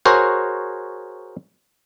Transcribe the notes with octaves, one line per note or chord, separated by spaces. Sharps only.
F#4 G#4 A#4 C5 C#5